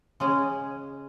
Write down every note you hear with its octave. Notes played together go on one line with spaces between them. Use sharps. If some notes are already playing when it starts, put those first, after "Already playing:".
C#3 G#3 C#4 G#4